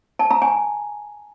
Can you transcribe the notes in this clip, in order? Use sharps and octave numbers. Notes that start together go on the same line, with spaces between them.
A5
A#5
G#5